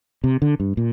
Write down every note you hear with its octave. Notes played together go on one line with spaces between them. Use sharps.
C3
D3
G2
A#2